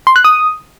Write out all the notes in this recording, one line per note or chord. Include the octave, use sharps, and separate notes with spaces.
C6
F#6
D#6